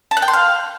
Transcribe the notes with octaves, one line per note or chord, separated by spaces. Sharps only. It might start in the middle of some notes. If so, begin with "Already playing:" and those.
A5
F#6
G5
C6
F5